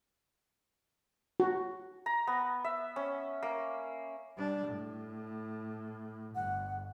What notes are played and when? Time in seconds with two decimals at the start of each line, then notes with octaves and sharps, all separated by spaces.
1.40 F#4
2.06 A#5
2.27 B3
2.64 E5
2.96 C#4
3.43 A#3
4.37 G3 D4
4.67 A2
6.35 G1 F#5